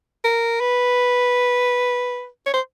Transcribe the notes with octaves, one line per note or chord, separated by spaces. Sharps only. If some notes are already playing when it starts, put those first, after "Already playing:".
A#4
B4
C#5
C5